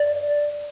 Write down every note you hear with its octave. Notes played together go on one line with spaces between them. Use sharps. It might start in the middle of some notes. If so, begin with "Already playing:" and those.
Already playing: D5